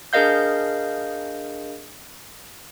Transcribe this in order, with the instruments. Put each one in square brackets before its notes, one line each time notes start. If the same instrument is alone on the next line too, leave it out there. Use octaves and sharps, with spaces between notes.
[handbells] D4 G#4 A#4 D#5 F5 G6